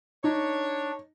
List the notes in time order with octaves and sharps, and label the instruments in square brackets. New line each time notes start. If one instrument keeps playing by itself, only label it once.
[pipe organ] D4 [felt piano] D#4 [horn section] C#5